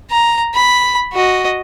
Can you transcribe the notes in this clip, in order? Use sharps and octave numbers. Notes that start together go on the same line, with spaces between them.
A#5
B5
F#4 D#5